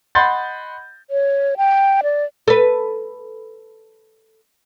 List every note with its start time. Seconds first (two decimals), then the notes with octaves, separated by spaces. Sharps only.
0.15 D#5 F#5 B5 C6 G6 A6
1.09 C#5
1.57 G5
2.03 D5
2.48 A4 B4